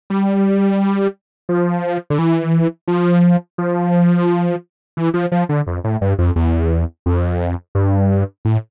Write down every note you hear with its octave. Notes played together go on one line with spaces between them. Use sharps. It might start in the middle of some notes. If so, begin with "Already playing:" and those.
G3
F3
D3
E3
F3
F3
E3
F3
F3
D3
F2
A2
G2
F2
E2
F2
G2
A2